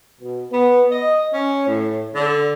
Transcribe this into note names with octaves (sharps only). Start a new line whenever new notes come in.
B2
B3
D#5
C#4
A2
D3